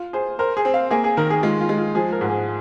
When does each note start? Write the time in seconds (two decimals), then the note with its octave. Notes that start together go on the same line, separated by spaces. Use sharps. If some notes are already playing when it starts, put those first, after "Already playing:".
Already playing: F4
0.13 G#4 C5
0.39 A#4 C5
0.57 G#4
0.65 C4
0.74 F5
0.91 A#3 G#4
1.04 G#4
1.17 D#3 A#4
1.30 G#4
1.43 G#3 F4
1.61 F4
1.69 G#3
1.78 F4
1.95 F3 G#4
2.12 A#4
2.21 G#2
2.29 G#4